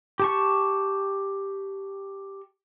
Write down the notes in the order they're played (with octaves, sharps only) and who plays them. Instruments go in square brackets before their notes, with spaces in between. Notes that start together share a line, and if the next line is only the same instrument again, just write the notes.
[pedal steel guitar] G4 A5 C#6